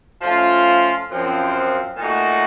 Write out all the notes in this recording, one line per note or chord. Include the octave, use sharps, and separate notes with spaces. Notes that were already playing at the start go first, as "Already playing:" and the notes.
F3 A3 C#4 F4
F#2 F3 C4
A#2 A3 D#4 F#4